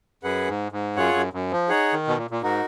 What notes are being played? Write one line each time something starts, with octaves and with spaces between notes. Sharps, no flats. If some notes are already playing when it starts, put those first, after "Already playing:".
F#2 G#4 B4 F#5
G#2
G#2
F#2 F4 G#4 C#5 F#5
F#2
F#2
F3
D#4 G#4 C#5 F#5
D#3
B2
A#2
A#2
G#2 D#4 F#4 A#4